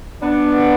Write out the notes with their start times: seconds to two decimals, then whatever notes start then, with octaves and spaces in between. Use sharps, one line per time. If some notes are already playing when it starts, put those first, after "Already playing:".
0.22 B3 D4